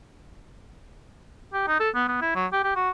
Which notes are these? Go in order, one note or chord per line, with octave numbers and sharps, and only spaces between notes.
G4
D#4
A4
B3
B3
E4
F#3
G4
G4
F#4